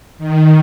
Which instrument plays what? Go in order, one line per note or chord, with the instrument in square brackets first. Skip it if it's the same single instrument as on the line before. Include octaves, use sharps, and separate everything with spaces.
[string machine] D#3